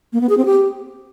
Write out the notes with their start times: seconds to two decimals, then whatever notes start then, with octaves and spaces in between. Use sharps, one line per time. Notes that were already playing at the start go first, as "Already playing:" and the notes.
0.13 A#3
0.21 B3
0.29 G#4
0.37 C4
0.46 G4